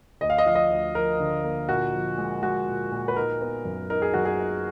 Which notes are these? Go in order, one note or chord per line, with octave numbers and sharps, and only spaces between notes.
D2 D#5
F5
D#5
F3 F5
D#5
D2
F3 A#4
D3
A#3
A#2 F#4
F3
G#3
G#3 F#4
A#2
A#2
B4
D#4 A#4
B3
F#2
D#4 A#4
G#4
F#2 F#4
G#4
D#4